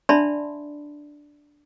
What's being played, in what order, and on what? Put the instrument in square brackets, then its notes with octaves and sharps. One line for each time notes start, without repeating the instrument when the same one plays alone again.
[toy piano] D4 D5 E5 A5 B5 C6